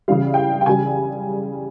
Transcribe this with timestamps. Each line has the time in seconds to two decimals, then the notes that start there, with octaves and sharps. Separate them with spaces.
0.08 C#3 E3 G3 F5
0.34 G5
0.37 F5
0.61 G5
0.66 C#3 G3 G#5